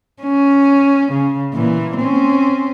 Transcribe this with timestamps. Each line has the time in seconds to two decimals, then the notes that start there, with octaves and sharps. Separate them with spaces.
0.23 C#4
1.13 C#3
1.54 A#2 E3
1.97 C4 C#4